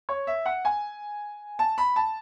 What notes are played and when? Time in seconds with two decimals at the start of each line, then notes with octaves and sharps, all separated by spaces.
0.09 C#5
0.27 E5
0.46 F#5
0.65 G#5
1.59 A5
1.78 B5
1.96 A5